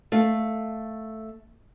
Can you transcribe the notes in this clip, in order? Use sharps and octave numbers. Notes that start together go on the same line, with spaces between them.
A3 F5